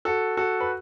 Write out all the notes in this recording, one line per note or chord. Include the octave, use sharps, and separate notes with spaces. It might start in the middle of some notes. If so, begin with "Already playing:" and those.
F#4 A4
F#4 A4
B4